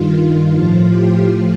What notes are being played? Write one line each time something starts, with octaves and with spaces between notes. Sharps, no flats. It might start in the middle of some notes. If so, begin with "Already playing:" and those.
Already playing: G2 D#3 F4
F4
A2 F3
G4
A2 F3 F4